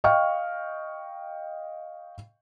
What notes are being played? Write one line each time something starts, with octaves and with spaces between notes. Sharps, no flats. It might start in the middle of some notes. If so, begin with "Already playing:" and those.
D#5 F5 G5 C#6 F6